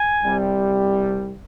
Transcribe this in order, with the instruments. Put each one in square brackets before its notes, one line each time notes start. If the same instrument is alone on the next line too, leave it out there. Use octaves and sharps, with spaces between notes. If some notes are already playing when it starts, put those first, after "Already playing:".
Already playing: [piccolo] G#5
[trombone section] C2 C3 G3